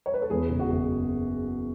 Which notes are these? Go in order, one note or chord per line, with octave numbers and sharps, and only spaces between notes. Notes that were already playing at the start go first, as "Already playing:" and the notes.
C#5
B4
A4
E2 G#4
F#1
F#4
F#1